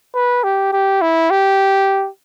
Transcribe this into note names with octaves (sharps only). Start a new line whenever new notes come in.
B4
G4
G4
E4
G4